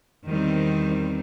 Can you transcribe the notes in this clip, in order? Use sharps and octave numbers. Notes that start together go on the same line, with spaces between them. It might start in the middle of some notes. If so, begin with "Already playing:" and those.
E2 D#3 G3 C4